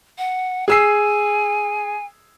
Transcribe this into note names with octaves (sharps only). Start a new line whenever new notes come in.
F#5
G#4 G#5 E6 C7